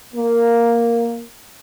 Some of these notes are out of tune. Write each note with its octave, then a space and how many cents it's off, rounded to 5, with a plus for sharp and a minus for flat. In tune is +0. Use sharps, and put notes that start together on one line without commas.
A#3 +0